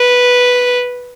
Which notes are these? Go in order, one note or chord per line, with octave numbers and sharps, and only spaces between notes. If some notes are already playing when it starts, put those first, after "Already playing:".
Already playing: B4